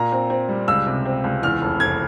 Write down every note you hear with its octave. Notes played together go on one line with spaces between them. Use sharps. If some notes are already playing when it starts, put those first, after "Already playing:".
Already playing: A#2 A#5
C4
C4
G3
C#2 E6
C3
C4
C#2
E2 F6
F1
F1 G#6